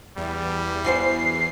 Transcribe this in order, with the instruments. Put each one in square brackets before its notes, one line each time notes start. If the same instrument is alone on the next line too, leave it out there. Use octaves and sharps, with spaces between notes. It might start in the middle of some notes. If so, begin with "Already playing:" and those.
[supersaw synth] E2 [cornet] G3
[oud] E3 F#4 C5 [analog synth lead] C7